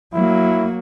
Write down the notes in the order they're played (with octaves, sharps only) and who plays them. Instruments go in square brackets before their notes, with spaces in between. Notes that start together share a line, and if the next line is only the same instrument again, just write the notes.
[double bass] F#3 A#3 [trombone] E4